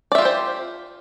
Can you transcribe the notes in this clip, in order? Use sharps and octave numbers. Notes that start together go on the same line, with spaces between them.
F4 G4 C5 D5 E5